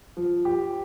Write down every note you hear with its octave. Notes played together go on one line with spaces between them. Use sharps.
F3
G4